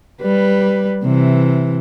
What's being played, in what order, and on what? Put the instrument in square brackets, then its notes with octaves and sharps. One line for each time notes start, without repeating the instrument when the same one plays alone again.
[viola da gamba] G3 B4
C3 E3